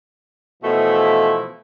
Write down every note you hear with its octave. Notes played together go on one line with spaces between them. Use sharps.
B2 E3 F3 A3 E4